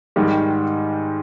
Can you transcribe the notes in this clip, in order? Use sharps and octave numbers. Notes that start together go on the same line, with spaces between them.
G#2 D#3 G3